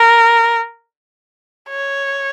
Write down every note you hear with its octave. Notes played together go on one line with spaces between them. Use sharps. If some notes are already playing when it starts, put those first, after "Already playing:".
Already playing: A#4
C#5